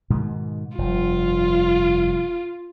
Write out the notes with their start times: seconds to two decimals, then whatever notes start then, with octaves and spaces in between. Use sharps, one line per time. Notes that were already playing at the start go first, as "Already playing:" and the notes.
0.10 G#2 B2 D#3
0.78 F1 G2 F4